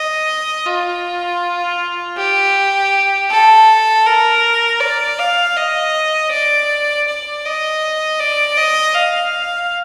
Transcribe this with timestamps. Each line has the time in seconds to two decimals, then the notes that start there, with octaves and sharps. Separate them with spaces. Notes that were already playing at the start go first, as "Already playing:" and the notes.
Already playing: D#5
0.66 F4
2.17 G4
3.30 A4
4.06 A#4
4.80 D5
5.19 F5
5.56 D#5
6.31 D5
7.07 D5
7.45 D#5
8.19 D5
8.57 D#5
8.95 F5